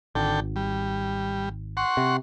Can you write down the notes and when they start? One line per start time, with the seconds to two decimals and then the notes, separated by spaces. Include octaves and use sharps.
0.15 G#1 D3 A4 G5
0.56 G3
1.77 F#5 C6 C#6
1.97 C3